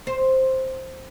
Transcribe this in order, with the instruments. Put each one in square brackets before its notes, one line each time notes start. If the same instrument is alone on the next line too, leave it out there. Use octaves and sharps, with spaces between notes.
[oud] C5